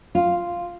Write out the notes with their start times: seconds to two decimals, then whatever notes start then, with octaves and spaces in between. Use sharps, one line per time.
0.15 F4